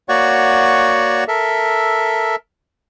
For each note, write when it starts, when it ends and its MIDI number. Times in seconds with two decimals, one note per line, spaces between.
0.09 1.24 58
0.09 1.24 66
0.09 1.24 73
0.09 1.24 74
0.09 1.24 78
0.09 1.24 85
1.28 2.36 69
1.28 2.36 70
1.28 2.36 76